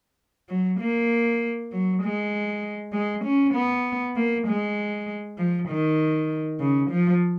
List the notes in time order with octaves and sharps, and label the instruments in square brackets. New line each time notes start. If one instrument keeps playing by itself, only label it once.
[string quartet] F#3
A#3
F#3
G#3
G#3
C#4
B3
A#3
G#3
F3
D#3
C#3
F3